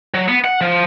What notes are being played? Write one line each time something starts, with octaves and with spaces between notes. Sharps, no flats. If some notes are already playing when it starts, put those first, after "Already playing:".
F#3
B3
F#5
F3